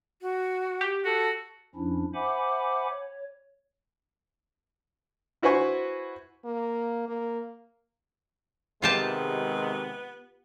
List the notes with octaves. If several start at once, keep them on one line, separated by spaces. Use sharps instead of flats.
F#4
G4
F#4 A4
F2 F3 C#4 D4 E4
C5 E5 F#5 G#5 B5 D6
C#5
E4 F#4 B4 C5 G#5 C#6
A#3
A#3
C3 D#3 G#3 B3 F4 G4 A5